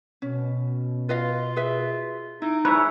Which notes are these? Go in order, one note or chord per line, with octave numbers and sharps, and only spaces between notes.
B2 C#4
F4 B4 D#5 F5
G#4 B4 E5
D#4 E4 D7
E4 G#4 B4 C#5 E5